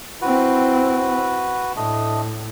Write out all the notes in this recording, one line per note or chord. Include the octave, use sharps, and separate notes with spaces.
C4 E4 F#4 B4
A2 A3 D4 D#5